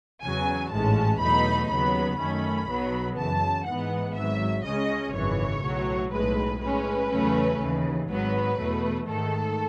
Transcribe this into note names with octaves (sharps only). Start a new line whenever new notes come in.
E2 C#3 F#3 G#5
A1 G#2 E3 G#3 C#4 A5
E2 B2 F#3 A3 D#4 B5
D#2 C#3 F#3 B3 B5
F#2 D#3 A3 C#4 B5
B1 B2 F#3 B3
F#2 C#3 E3 A5
G#2 E3 G#3 B3 F#5
G#1 G#2 F#3 E5
C#2 C#3 G#3 C#4 D#5
G#1 F#2 C#3 E3 C#5
B1 A2 F#3
B1 A2 G#3 B4
A2 G#3 C#4 B4
E2 C#3 F#3 A3 C#4
D#2 C#3 E3
G#1 G#2 F#3 B3 B4
E2 B2 A3
G#2 D#3 A3 A4